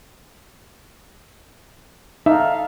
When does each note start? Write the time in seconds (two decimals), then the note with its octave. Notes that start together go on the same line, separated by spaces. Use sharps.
2.26 D#4 A4 E5 F5